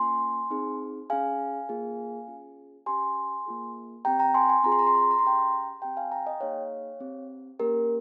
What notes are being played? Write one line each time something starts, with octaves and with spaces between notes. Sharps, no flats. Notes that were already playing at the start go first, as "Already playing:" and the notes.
Already playing: A#3 C#4 F4 G#5 C6
C4 D#4 G#4
C#4 G#4 F5 G#5
A#3 F4 G#4
C#4 F4 G#4
C#4 G4 G#5 C6
A#3 F4 G#4
C4 G4 G5 A#5
G5 A#5
G#5 C6
G#5 C6
C4 F4 G#4 A#5
C6
A#5
C6
A#5
C6
A#5
C6
C#4 G4 G5 A#5
C4 G4 G5 A#5
F5 G#5
G5 A#5
D#5 G5
A#3 D#4 G#4 C#5 F5
C4 G4
A#3 C#4 G4 A#4